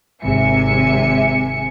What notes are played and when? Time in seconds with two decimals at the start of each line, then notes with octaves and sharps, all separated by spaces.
0.23 G#1 C3 E5 G#5 C#7